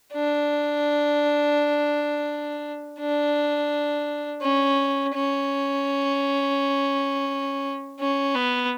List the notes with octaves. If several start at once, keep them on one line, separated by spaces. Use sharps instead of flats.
D4
D4
C#4
C#4
C#4
B3